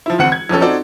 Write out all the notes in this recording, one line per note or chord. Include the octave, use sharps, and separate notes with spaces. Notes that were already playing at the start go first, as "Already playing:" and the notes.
F3 E4
E1 D2 C4 F#5 C#7 F#7
G#6
A#1 F2 C#4 A4
C4 D#4 F#4 A4 D5